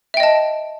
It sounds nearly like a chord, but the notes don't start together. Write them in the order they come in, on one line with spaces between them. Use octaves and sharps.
E5 G5 D#5 A5